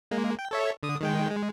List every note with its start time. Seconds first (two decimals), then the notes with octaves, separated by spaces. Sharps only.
0.11 G#3 A#3
0.39 G5
0.51 A4 C#5 E5
0.83 D3 D#6
1.01 D#3 G#3 G5
1.30 G#3